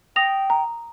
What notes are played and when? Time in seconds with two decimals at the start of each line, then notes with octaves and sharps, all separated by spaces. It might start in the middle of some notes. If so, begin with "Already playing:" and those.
0.16 G5 D#6 A#6 F7
0.50 A#5